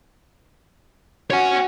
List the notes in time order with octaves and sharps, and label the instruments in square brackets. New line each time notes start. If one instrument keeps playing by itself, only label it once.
[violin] F#4 [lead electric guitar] C#5 G#5